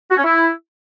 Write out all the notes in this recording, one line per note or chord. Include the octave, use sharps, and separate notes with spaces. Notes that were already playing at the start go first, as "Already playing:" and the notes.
F#4
C#4
E4